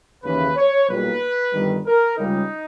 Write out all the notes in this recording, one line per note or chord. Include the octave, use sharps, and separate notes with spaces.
D#2 C#3 E3 B4
C#5
B1 A#2 G3 B4
G1 G2 D#3 G3
A#4
C#2 C#3 G3 D#4